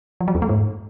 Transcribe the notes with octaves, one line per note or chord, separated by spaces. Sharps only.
F3
F#3
E2
A3
G#2